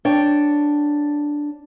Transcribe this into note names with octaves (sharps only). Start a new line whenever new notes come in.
D4 C#5 G5